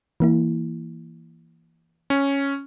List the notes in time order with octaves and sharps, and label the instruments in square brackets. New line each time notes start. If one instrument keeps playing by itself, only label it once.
[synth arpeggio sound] E3 A#3 E4
[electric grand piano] C#4